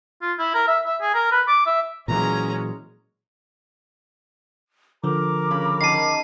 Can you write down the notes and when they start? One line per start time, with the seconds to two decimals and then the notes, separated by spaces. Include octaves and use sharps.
0.22 F4
0.39 E4
0.54 A#4
0.67 E5
0.85 E5
1.01 G#4
1.14 A#4
1.31 B4
1.48 D6
1.66 E5
2.08 A#2 E3 F#3 G#3 C#4 A#5
5.04 D3 F3 A#4 A#5 D6
5.51 C#3 B5
5.81 D#3 A5 C7 D#7